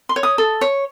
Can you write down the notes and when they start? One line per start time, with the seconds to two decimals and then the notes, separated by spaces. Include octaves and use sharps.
0.09 C6
0.16 C#5
0.23 D#6
0.38 A4
0.61 C#5